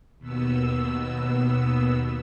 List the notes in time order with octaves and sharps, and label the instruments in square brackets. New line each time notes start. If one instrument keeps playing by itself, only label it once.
[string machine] D#2 B2 B3 E6